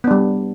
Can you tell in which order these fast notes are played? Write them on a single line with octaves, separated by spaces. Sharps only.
B3 D4 G3